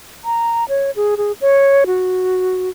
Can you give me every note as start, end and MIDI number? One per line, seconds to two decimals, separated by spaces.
0.24 0.64 82
0.69 0.91 73
0.96 1.15 68
1.17 1.32 68
1.41 1.84 73
1.87 2.69 66